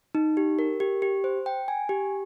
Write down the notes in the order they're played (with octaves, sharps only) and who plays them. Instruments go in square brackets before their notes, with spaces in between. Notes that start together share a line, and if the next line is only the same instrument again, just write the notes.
[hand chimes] D#4
G4
A#4
G4
G4
C5
G5
G#5
G4